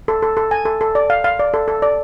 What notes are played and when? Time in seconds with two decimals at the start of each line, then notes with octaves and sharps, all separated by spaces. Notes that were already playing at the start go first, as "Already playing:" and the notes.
0.08 A4
0.22 A4
0.37 A4
0.51 G#5
0.65 A4
0.81 A4
0.95 D5
1.10 F5
1.24 F5
1.39 D5
1.54 A4
1.68 A4
1.82 D5